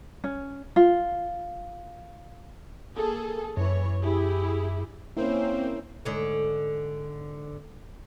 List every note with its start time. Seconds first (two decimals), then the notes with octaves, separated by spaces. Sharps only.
0.24 C#4
0.76 F4
2.96 A#3 G#4 A4
3.57 F#2 E3 C#5
4.01 E4 G4 G#4
5.17 A#3 C4 C#4 E4 C5
6.05 G#2 D3 C#5